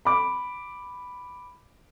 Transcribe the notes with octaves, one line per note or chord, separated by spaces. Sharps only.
B5 D6